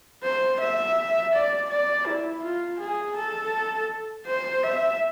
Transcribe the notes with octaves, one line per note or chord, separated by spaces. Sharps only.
C5
E5
D5
D5
E4
F4
G#4
A4
C5
E5